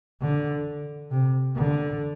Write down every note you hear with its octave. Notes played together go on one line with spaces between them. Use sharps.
D3
C3
D3